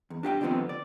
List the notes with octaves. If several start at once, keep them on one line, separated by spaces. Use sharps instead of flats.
E2
D4 G4 F5 G5
D#2 D3 F3 A3 B3 C4
D5